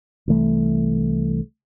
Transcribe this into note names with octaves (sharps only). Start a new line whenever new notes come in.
C2 E3 A3